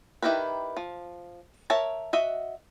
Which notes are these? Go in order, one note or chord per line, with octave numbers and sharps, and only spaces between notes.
D#3 E4 G4 A#4 B4
F3
A#4 C#5 E5 A5
F#4 D#5 E5